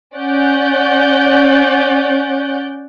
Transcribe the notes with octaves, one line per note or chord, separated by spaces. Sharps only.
C#4 D5 F#5 F#6 G6